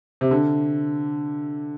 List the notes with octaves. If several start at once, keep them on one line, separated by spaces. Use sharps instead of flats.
C3
D3